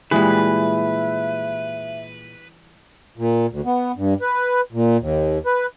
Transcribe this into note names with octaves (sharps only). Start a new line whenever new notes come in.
A#2 E3 G3 G#3 G#4 B4 E5
A#2
D2
B3
G2
B4
A#2
D#2
B4